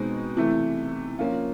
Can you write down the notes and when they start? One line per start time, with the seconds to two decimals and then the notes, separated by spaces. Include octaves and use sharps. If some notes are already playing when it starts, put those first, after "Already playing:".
Already playing: B2 G#3 C4 D#4
0.36 C3 E3 A3
1.19 F3 A#3 C#4 F4